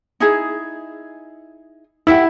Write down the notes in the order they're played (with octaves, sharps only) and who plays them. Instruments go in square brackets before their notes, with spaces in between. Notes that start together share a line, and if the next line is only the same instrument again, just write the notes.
[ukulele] D#4 E4 G#4
[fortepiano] E4 [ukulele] G4 E5 F#5